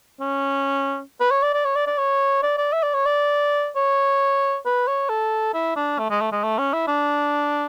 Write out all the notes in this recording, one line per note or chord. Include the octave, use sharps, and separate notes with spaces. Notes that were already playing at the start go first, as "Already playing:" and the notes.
C#4
B4
C#5
D5
D5
C#5
D5
D5
C#5
D5
D5
E5
D5
C#5
D5
C#5
B4
C#5
A4
E4
D4
A3
G#3
A3
G#3
A3
C#4
E4
D4